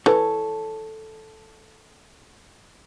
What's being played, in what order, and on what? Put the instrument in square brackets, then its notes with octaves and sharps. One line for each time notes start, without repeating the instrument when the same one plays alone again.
[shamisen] E3 [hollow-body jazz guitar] A4 C#5